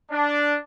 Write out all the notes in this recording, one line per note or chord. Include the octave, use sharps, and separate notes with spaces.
D4